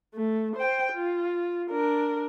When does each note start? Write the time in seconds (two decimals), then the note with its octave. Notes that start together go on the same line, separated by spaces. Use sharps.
0.15 A3
0.56 C5 G5
0.93 F4
1.71 D4 A#4